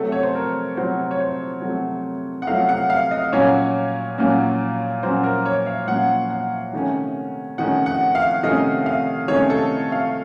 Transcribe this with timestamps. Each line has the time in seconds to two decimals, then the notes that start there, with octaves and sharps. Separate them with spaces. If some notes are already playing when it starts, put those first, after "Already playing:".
Already playing: C3 F#3 A3 A4
0.12 C#5
0.23 C5
0.35 A#4
0.77 C3 F#3 A3 C5
1.11 C#5
1.20 C5
1.62 C3 F#3 A3
2.42 F#5
2.47 C3 F#3 A3 F5
2.69 F#5
2.90 F5
3.11 D#5
3.33 A#2 F#3 A#3 C#4 C#5
4.18 A#2 F#3 A#3 C#4
5.03 A#2 F#3 A#3 C#4 C5
5.24 A#4
5.45 C#5
5.66 F5
5.88 A#2 F#3 A#3 C#4 F#5
6.30 F#5
6.73 C3 D#3 A3 C#4
7.58 C3 D#3 A3 C#4 F#5
7.86 F#5
8.15 F5
8.43 C3 D#3 A3 C#4 D#5
8.86 F5
9.28 C3 D#3 A3 C#4 C#5
9.50 A4
9.92 F5